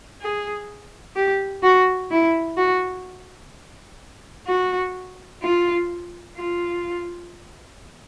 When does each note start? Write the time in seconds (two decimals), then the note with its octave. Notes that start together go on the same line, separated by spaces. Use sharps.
0.21 G#4
1.16 G4
1.63 F#4
2.11 E4
2.57 F#4
4.48 F#4
5.42 F4
6.36 F4